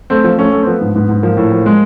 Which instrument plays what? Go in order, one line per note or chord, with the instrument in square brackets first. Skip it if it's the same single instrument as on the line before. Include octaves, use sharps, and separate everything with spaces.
[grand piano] A3 C4
F3
A3 C#4
A3
C4
F3 B3
G#2
G#2 B3
G#2
F3 A#3
A2
F3
G#3